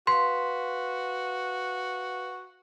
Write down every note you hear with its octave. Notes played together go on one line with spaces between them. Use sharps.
F#4 B4 F5 C6